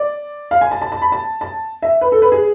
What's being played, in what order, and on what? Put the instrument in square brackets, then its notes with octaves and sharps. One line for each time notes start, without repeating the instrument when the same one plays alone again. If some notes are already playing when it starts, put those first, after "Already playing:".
Already playing: [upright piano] D5
F5
G#5
A5
A5
A5
B5
A5
A5
E5
B4
A4
B4
G#4